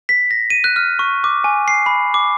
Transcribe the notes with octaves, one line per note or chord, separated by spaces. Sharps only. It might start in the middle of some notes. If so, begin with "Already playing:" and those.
B6
A#6
D#7
F#6
F6
C#6
D6
G#5
C7
B5
D6